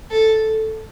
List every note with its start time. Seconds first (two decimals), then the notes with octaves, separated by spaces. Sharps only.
0.11 A4